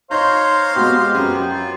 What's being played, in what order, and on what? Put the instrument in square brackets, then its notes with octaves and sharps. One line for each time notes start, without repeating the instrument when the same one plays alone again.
[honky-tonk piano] D#4 C6 [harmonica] C5 F5 [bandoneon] C#5 A#5 G6
[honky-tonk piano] B2 G#3 [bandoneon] B3 G4
[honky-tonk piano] F#2
[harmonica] F4